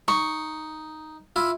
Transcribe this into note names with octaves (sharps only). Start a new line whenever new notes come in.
D#4 C#6
E4 F4